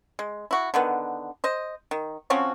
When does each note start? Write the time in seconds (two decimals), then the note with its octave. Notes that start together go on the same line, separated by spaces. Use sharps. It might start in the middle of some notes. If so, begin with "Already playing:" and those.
0.19 G#3
0.51 E4 F#4
0.74 D3 D#3 B3
1.44 C5 D#5
1.91 D#3
2.30 F3 C4 C#4 F#4